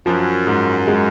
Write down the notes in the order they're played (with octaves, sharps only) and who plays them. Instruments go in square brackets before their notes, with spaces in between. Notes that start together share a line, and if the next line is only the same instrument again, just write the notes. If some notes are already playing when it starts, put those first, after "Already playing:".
[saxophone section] F#2 [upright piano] F3
[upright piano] G#2
G#3